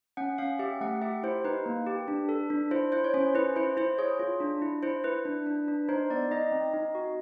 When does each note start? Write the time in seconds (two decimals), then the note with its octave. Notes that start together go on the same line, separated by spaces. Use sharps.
0.17 C#4 F#5
0.38 C#4 F5
0.59 G4 E5
0.81 A3 F#5
1.02 G4 E5
1.23 E4 C5
1.44 D#4 B4
1.66 A#3
1.86 G4
2.08 D4
2.29 A4
2.50 D4
2.71 E4 C5
2.92 E4 C5
3.04 C#5
3.14 C#4 C5
3.35 E4 B4
3.56 E4 C5
3.77 E4 C5
3.99 G#4 C#5
4.19 F4
4.40 D4
4.62 E4
4.83 E4 C5
5.04 E4 B4
5.25 D4
5.47 D4
5.68 D4
5.89 D#4 C5
6.10 B3 D5
6.31 D#4 D#5
6.52 C4
6.74 D#4
6.95 F#4